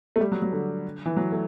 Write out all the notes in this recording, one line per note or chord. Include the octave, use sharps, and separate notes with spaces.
A3
G3
F#3
F#3
D3
E3
F#3
A3